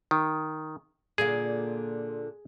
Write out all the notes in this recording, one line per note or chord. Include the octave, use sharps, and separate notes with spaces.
D#3
A#2 D3 A#3 G#4